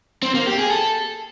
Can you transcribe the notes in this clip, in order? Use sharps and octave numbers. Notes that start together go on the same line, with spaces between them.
C4
A#3
G4
G#4
A4